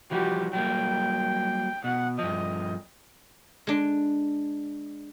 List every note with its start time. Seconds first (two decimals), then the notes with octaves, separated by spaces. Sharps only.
0.11 E3 F3 G3 F#4 G4
0.53 F#3 G3 A#3 G5
1.84 B2 F#5
2.19 G2 F3 D#5
3.67 G#3 D4